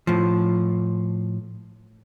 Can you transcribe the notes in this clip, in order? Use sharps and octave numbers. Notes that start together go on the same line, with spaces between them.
A2 F3